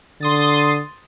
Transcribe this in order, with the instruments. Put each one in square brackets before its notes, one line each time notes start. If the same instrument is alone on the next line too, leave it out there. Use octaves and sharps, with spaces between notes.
[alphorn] D3 [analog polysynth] C6 D#6 A6